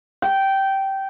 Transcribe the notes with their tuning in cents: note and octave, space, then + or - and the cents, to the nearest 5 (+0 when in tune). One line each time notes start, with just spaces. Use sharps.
G5 -15